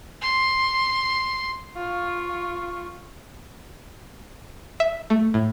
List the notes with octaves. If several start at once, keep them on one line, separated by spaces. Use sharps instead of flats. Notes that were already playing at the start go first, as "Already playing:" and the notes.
C6
F4 C#6
E5
A3
A2